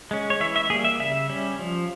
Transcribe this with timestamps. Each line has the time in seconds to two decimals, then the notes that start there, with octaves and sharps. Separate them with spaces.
0.11 G#3 C#4
0.30 C#5
0.40 E3 E5
0.56 E5
0.70 A#3 G#4
0.74 G3
0.85 E5
1.00 C#3 E5
1.30 G3 C#4
1.59 F3